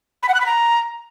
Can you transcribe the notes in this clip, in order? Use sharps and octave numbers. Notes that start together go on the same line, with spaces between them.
B5
F#5
F#6
B5
A#5